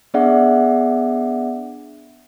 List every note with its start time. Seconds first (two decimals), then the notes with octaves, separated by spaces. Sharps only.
0.14 B3 D4 G#4 D5 E5 F#5